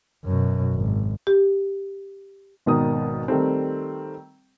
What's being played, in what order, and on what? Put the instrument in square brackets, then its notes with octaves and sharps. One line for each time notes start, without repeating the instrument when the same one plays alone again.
[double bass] F#2 B2
G#1
[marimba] G4
[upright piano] G#1 B2 D#3 D#6
D#3 G3 A3 C4